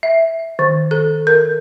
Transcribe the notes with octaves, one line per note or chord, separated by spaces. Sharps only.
E5
D#3
A4
A#4